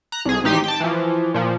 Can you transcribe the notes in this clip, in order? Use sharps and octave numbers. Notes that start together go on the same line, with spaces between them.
A#5 F#6
C2 G#4
A1 D#4 G4 C6 B6
G5 A5
E3 F3
A#2 F3